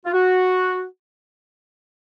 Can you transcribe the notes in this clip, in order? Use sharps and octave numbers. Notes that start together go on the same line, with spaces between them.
F4
F#4